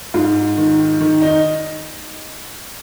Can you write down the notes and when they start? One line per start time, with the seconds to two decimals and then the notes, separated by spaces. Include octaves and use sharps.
0.14 G#2 F4
0.58 D#3
1.01 D#3
1.22 D#4